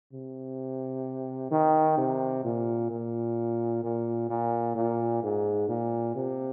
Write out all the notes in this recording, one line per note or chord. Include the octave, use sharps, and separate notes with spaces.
C3
D#3
C3
A#2
A#2
A#2
A#2
A#2
G#2
A#2
C3